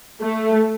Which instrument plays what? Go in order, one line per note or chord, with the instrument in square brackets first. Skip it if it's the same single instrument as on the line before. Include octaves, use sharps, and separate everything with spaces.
[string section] A3